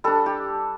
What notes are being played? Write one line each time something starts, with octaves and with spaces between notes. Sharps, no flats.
G3 D4 A4
G4